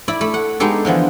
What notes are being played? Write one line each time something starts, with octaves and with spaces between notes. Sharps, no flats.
E4 D5 B5
A3 B5
F#5
G#3 B3 D#4 G4 A4
D3 E3 F3 B3